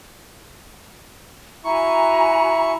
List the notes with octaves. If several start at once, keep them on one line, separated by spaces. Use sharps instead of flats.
E4 F#4 G#5 A#5 C#6